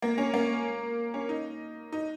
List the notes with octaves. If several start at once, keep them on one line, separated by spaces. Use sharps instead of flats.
A#3
C#4
A#3
C#4
D#4
D#4